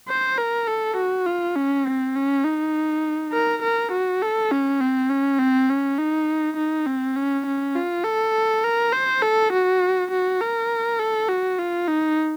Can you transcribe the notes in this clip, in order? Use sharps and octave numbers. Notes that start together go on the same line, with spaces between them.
C5
A#4
A4
F#4
F4
C#4
C4
C#4
D#4
A#4
A#4
F#4
A4
C#4
C4
C#4
C4
C#4
D#4
D#4
C4
C#4
C#4
F4
A4
A#4
C5
A4
F#4
F#4
A#4
A4
F#4
F4
D#4